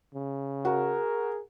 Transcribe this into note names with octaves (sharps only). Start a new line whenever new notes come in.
C#3
F#4 G#4 A#4